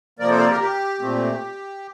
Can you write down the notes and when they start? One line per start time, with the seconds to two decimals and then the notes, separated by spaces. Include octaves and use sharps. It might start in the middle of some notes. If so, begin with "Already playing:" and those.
0.19 C3 F3 A#3 A#4 D5
0.29 A4 C5
0.39 A#4 D5
0.49 G4 A#4
0.60 G4
1.00 A#2 A3 C4